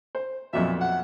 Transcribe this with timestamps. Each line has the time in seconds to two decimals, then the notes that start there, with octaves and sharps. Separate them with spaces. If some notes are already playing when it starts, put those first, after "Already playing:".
0.15 C5
0.53 B1 F2 A#2 E5
0.81 F#5